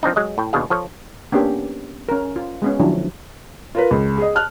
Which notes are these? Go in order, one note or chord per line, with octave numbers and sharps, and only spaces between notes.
F3 C4 D4 D#4
F#3 G#3 D#5
A2 G5
D#2 B2 D4 G#4 F5
F3 A4 C#5
A#3 B3 C#4 D4 G4
C#4 A#4
F4
G#3 B3 C#4
D3 F3 F#3 D4 E4 C#5
F4 A#4 B4
C#2
G#4 D#5
A5 F6 F#6